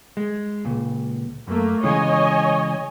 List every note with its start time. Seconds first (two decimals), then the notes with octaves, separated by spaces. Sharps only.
0.17 G#3
0.65 C#2 A#2
1.47 F#2 A3 A#3
1.83 C#3 E3 G#3 C#5 D#5 G#5